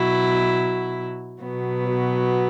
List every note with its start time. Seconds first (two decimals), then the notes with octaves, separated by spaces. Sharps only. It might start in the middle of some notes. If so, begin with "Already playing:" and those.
Already playing: B2 F#3 E4
1.42 B2 F#3 B3